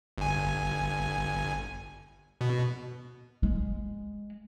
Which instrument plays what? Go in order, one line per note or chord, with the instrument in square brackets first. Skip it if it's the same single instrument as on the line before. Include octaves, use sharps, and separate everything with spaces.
[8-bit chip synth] G1 G#5
B2
[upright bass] G#3